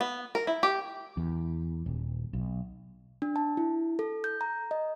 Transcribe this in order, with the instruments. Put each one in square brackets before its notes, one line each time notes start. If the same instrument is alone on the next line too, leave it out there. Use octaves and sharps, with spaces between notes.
[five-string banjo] B3
A#4
E4
G4
[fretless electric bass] E2
D#1
B1
[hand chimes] D4
A5
E4
A4
G6
A#5
D#5